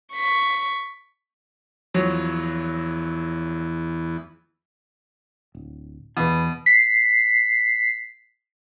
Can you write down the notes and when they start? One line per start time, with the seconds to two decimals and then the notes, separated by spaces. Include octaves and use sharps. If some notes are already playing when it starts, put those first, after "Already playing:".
0.13 C#6 B6
1.94 E2 F3 F#3
5.55 D1
6.17 E2 B2 E3 B4 B5
6.66 B6 C7